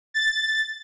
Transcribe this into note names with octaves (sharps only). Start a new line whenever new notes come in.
A6